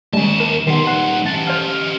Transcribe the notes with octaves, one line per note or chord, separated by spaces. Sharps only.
D#2 G3 G#3 C#4 A5
A#4
D#3 G3 B3 D#4 C6
F#5
C#4 G4 A5
C5 F5 F6